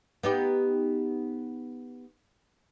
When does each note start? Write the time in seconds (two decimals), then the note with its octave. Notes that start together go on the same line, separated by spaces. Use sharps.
0.23 B3 D#4 G4